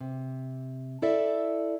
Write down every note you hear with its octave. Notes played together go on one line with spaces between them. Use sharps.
C3
E4 A4 D5 E5